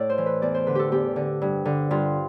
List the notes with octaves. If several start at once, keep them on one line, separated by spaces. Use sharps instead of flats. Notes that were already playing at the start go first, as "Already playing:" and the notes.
Already playing: A2 D5
C5
E3
B4
E2 D5
C5
D3 B4
G4 A4
E2 G4
D3
G2
D3
G2 F4